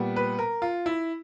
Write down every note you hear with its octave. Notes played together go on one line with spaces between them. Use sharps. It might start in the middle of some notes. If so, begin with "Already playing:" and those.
Already playing: A#2 G3 B3
B4
A#4
F4
E4